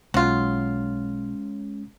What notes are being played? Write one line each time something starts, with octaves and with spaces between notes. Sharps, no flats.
B1 F#3 G#3 C#4 F4